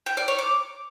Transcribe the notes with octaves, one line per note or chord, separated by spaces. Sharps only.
G5
D5
C#5
D6